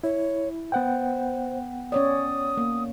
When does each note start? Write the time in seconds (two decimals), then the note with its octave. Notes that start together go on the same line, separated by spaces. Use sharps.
0.04 E4 C#5
0.72 B3 C5 F#5 G5
1.92 C#4 C#5 D5 D#6
2.57 A#3